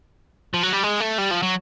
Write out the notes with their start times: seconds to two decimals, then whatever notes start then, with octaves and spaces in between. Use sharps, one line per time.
0.54 F3
0.63 F#3
0.72 G3
0.83 G#3
1.00 A3
1.18 G3
1.31 F3
1.43 F#3